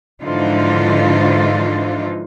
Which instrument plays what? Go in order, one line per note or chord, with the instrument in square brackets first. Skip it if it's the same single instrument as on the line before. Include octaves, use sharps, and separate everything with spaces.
[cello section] G#2 D3 E3 F3 D#4 F4